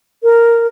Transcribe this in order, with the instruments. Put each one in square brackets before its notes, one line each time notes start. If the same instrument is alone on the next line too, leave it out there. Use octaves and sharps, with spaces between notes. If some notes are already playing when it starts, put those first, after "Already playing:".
[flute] A#4